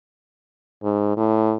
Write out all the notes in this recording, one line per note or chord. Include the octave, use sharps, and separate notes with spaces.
G#2
A2